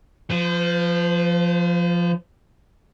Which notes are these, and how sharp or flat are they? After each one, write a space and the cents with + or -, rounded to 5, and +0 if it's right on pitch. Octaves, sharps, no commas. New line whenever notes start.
F3 +0 C5 -45